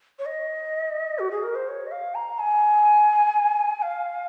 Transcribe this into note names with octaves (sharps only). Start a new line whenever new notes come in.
C#5
D#5
F#4
G#4
A#4
C5
C#5
D#5
F5
A#5
G#5
F5